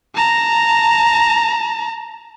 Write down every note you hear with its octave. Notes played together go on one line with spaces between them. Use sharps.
A5 A#5